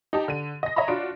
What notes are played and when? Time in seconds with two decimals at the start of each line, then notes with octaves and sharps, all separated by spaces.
0.13 D#4 G4 A5
0.28 D3 D#7
0.63 D#5 A#6
0.76 C#5 D#5 E5 A#5 B5
0.88 D4 F4 F#4 D7